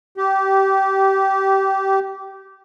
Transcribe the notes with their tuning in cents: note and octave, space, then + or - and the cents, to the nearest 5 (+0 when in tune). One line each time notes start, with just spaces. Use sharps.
G4 -20